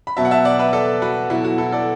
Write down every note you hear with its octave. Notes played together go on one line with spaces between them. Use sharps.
B5
B2 F#3 E5 A5
F#5
E5 A5
D5 F#5
B4 E5
A4 D5
F#4 B4
B2 F#3 E4 A4
F#4
E4 A4
A4 D5